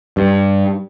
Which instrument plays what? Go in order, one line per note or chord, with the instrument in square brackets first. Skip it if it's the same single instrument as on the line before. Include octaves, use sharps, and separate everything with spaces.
[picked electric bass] G2